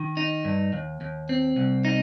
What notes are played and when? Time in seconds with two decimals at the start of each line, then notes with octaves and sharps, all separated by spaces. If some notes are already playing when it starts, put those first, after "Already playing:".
Already playing: D#3
0.17 D#4
0.45 G2
0.73 D#2
1.01 D#2
1.29 C4
1.56 C2
1.85 D#4